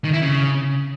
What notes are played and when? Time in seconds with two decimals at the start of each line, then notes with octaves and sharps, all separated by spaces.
0.04 D#3
0.13 E4
0.22 C#3